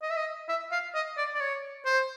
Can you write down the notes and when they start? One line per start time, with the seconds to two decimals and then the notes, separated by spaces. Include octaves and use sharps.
0.02 D#5
0.10 E5
0.16 D#5
0.49 E5
0.72 F5
0.94 D#5
1.17 D5
1.34 D5
1.40 C#5
1.85 C5